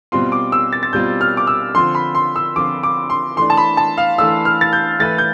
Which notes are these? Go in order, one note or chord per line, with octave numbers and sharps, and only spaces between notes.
B2 G3 C4 F4 C6
D6
E6
A6
A6
B2 G3 C4 F4 G6
F6
D6
E6
D3 F3 C4 F4 C6
B5
C6
E6
D3 F3 C4 F4 D6
D6
C6
E3 A3 D4 C6
A5
B5
A5
F5
E3 A3 D4 E6
F6
A6
G6
E3 A3 E4 B4 A6
G6